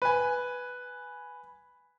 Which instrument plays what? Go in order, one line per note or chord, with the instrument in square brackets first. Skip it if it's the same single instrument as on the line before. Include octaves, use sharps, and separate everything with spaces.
[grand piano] B4 G#5